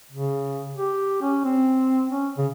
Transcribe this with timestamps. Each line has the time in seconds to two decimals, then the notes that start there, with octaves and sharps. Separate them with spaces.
0.12 C#3
0.76 G4
1.22 C#4
1.44 C4
2.10 C#4
2.38 C#3